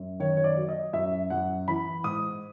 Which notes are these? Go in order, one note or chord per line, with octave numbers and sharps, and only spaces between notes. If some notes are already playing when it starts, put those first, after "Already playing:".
Already playing: F#2
D#3 C#5
C#5
D5
F#3
D#5
F#2 E5
F#2 F#5
E3 B5
G#2 D#6